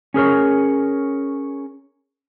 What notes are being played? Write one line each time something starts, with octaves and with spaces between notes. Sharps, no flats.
C#4 G#4 A#4 C#5